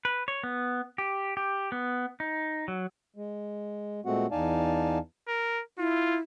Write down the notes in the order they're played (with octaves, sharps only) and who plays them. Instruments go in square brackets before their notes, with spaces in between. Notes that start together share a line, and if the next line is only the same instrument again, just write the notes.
[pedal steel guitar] B4
C#5
B3
G4
G4
B3
D#4
F#3
[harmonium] G#3
A#2 G#3 A3 C4 F#4 F#5
E2 D#4 D5 F5 G#5 A5
[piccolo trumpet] A#4
[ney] E4 [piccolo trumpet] F4